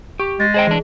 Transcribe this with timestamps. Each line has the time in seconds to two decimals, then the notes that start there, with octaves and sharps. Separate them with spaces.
0.19 G4 C#6
0.40 G#3 A6
0.54 G#4 C5 D#5 G5
0.67 E3 D4 G#4